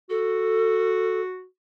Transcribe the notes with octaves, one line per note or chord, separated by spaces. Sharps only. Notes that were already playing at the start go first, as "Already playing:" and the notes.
F#4 A4